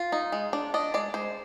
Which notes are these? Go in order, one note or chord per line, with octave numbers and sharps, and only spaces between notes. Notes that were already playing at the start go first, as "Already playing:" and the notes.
Already playing: F4
D#4
G#3
D4
D4 D#5
G#3 D5
G#3 C5